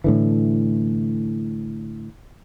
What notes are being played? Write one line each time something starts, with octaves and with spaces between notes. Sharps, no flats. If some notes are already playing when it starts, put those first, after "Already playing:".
A2 D3 E3